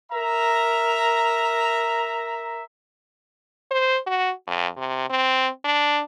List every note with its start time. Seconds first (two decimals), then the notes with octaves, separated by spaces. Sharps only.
0.11 A#4 E5 A#5
3.71 C5
4.06 F#4
4.47 F2
4.77 C3
5.10 C4
5.65 D4